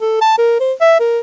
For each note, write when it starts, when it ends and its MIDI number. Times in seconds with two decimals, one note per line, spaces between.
0.01 0.18 69
0.22 0.34 81
0.38 0.57 70
0.60 0.73 72
0.81 0.96 76
1.00 1.20 70